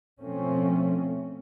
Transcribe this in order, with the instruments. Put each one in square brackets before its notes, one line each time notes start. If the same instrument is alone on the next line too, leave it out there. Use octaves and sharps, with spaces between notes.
[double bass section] B2 F3 A3 C4 C#4